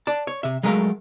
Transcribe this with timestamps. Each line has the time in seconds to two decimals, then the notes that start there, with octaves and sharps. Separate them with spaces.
0.07 D5 A5
0.27 C#5
0.43 C3 E5
0.63 F#3 G#3 A3 A#4 F5